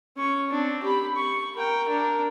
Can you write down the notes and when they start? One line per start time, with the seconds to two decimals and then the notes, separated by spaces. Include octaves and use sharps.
0.17 C#4 C#6
0.50 C4 D4
0.83 G4 B5
1.16 C#6
1.55 A#4 G5
1.88 D4 A#4